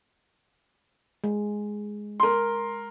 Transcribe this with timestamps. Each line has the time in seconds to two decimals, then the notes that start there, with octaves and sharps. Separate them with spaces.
1.24 G#3
2.20 A#4 C6